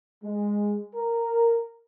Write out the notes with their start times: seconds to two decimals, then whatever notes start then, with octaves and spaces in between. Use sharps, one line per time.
0.23 G#3
0.94 A#4